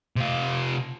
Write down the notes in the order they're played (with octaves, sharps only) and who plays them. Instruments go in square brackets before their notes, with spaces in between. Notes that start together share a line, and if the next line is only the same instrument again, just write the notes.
[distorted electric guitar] C3 F4